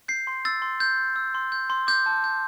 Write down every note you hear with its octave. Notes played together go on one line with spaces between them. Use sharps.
G6 C7
C6
E6 A6
C6
G6
C6
E6
C6
G6
C6
D6 G6
A5
G6